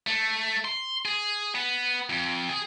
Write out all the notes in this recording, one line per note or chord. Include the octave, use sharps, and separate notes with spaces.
A3
C6
G#4
B3
F2
G#4